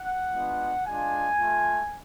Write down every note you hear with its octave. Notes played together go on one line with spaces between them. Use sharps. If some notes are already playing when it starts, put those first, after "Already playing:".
Already playing: F#5
G#3 B3 D4 F4
G#3 D4 F4 G#5
A3 F4